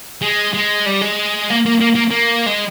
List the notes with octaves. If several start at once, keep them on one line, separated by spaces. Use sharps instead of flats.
G#3
G#3
G3
G#3
A#3
A#3
A#3
A#3
A#3
G#3